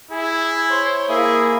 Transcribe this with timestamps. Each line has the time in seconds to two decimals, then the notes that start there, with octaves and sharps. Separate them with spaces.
0.11 E4 G#4
0.70 C5 C#5 C6
1.09 A#3 E4 G#4 E5